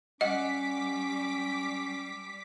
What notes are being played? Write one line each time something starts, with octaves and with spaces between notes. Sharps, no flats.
G3 C#4 D#5 F#5 D6 B6